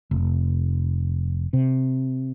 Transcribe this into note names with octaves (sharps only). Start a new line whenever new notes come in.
F1
C3